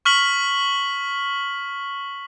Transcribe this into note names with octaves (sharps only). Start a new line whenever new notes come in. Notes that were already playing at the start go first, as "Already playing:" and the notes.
C#6 F6 B6 F#7